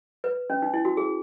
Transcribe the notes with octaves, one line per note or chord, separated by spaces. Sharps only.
B4
C#4
D#4
E4
F#4
G#4